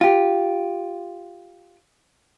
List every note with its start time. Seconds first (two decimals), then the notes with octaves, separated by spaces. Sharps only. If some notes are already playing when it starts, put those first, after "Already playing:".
0.01 F4 G4